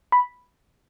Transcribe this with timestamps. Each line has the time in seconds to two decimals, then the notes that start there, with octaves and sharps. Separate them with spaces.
0.12 B5